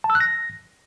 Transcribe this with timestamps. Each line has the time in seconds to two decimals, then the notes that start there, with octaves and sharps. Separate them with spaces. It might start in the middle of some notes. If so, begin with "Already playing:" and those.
0.04 A5
0.10 E6
0.15 F#6
0.20 A#6